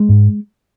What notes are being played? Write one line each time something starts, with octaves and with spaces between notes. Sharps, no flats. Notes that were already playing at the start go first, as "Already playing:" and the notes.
Already playing: G#3
G#2